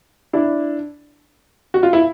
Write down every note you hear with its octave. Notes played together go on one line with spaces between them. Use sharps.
D4 E4
F#4
F4
E4